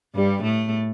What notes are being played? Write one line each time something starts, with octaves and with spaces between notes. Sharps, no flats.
G2 G3
A2 A3